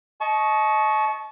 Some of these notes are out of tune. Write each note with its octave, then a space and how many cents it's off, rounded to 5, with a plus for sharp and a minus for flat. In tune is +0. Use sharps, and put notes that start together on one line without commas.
D#5 +10 A5 -35 C#6 +0